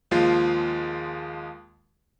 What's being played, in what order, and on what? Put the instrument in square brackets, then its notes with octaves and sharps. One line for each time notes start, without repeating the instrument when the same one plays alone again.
[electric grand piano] D#2 F3 G#3 F4 C7